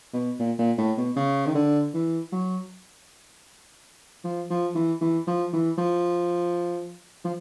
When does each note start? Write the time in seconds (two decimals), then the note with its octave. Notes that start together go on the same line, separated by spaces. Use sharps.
0.13 B2
0.39 A#2
0.59 A#2
0.78 A2
0.97 B2
1.16 C#3
1.47 D#3
1.55 D3
1.94 E3
2.32 F#3
4.24 F3
4.50 F3
4.75 E3
5.01 E3
5.27 F3
5.53 E3
5.78 F3
7.25 F3